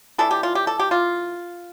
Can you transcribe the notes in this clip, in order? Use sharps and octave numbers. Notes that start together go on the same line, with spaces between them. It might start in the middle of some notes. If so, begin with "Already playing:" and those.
E3 A3 D4 A4
G4
F4
G4
A4
G4
F4